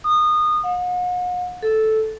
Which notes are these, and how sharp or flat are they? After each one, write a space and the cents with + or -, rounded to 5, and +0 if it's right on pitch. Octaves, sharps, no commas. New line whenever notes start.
D#6 -25
F#5 -45
A4 -5